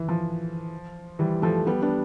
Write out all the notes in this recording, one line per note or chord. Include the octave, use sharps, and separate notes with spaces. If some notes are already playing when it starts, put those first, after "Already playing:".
Already playing: E3
F3
E3 G3
F3 A3
G3 B3
B3 D4